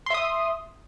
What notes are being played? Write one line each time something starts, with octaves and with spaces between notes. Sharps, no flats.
E5 C6 D#6